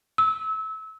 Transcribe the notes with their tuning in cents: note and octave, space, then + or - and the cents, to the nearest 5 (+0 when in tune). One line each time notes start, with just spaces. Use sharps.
E6 -25